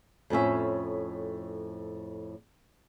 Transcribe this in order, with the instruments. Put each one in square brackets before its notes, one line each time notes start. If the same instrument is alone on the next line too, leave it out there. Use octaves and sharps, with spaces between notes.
[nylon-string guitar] F2 A2 C#4 E5